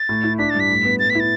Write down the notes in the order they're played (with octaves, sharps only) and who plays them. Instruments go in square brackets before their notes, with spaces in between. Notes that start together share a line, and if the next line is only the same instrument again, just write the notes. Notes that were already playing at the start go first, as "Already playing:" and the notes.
Already playing: [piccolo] A6
[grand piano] A2
E4
[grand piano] D4 [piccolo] B6
[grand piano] G2 [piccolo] A6
[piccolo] B6
[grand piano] A2
B3
[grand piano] A2 [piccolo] A6
[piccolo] B6
[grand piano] E4 [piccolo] A6